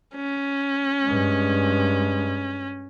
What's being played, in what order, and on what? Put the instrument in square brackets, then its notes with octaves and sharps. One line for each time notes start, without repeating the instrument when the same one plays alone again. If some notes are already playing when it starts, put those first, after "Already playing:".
[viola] C#4
[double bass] G2 G#3